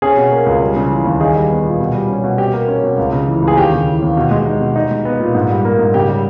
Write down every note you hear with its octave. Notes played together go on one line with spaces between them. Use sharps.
C#4 G#4
B2
A#3
C#2
G3
C#3
E3
D#2
D#4 G#4
G3
B3
A#2
B2
G3
C#4
B2
B2 G4
A#3
C#4
B2
C#2
C#3
E3
C#2
G#4
D#2 G4
C#3
E3
D#2
B2
G#3
D#4
B2
D#4
G#3
B3
A#2
G#2
G3
A#3
G#2
C#3 G4
G3